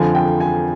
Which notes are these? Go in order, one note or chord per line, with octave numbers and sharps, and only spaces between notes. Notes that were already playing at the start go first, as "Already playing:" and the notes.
Already playing: F2 D3 F3 G#5
G5
G#5